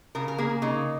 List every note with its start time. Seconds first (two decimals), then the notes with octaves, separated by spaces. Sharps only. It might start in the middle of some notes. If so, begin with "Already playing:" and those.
0.15 C#3 A#4
0.28 A#4
0.38 A#3 G#4
0.62 C#3 D#4